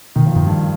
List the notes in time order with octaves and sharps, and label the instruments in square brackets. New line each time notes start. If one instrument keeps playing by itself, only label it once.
[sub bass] B2 [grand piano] D#3
[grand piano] F3
[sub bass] G2 [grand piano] D#3
[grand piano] G2